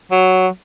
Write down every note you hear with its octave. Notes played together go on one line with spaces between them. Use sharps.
F#3